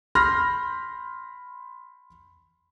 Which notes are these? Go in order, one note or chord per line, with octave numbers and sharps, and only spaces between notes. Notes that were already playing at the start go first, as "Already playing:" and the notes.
B5 C6 F6 G6 A#6